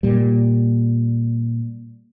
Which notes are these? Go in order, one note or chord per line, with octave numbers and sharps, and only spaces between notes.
A#2 G3